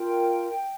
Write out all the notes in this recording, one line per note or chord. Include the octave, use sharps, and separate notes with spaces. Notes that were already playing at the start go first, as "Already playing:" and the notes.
Already playing: F4 A#4 G5